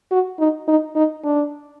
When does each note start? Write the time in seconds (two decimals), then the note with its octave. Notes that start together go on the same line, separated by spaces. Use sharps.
0.12 F#4
0.39 D#4
0.68 D#4
0.96 D#4
1.24 D4